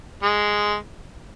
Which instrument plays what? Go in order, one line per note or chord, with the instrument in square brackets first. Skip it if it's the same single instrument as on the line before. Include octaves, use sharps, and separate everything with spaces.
[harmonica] G#3